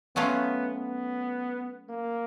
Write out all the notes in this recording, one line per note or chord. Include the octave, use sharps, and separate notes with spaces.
F#3 A3 B3 C#4 F4
B3
A#3